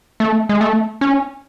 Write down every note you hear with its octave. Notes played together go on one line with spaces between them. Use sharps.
A3
G#3
A3
C#4